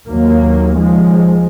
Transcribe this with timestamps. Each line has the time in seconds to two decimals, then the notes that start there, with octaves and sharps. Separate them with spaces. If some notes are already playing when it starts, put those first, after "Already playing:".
0.10 D#2 F#3 A#3
0.76 F3 G#3